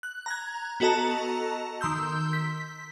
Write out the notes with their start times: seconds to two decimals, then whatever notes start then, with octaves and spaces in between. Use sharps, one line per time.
0.03 F#6
0.26 A#5 F#6 G#6
0.80 B3 F#4 A4 D#5 A5 A#5
1.81 D#3 C6 E6 G6
2.33 B6